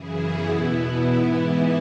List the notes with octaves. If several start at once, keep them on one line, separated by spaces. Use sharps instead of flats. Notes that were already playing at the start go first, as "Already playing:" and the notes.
Already playing: F#2 C#3 E3 E4 G#4
B3 E4
E2 B2
G#2 E3